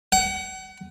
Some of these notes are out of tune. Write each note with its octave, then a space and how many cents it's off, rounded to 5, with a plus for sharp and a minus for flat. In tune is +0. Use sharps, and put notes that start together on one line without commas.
F#5 +35